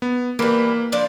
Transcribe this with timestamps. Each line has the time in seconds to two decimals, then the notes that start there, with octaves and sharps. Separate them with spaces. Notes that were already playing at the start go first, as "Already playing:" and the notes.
0.02 B3
0.39 E3 G3 A#3 B4
0.92 F3 D4 D5